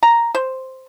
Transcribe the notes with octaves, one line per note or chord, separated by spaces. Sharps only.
A#5
C5